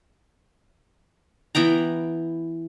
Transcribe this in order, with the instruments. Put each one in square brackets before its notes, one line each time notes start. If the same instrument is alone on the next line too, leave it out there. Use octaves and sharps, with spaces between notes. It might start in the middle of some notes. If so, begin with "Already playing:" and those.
[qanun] E3 B3 G5 A#5